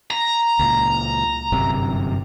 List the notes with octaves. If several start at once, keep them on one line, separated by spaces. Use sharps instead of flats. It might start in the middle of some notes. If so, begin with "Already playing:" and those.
A#5
C#2 A#2
G1 F#2 C3